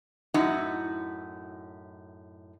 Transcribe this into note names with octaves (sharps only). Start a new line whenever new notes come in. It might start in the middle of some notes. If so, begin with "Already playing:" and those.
F#2 A2 D#4 E4 F#4